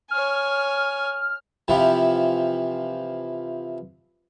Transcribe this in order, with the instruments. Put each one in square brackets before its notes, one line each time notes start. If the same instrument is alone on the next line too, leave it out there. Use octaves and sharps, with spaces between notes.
[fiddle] C#5 G#5 [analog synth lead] F6
[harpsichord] C3 E3 F3